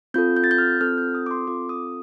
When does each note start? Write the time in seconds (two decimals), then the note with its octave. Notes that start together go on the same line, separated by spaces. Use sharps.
0.14 C4 F4 A4 G6
0.37 G6
0.44 A6
0.51 G6
0.58 F6
0.80 C4 F4 A4 F6
0.98 G6
1.15 D#6
1.26 D6
1.31 C6
1.47 C4 F4 A4 D6
1.69 D#6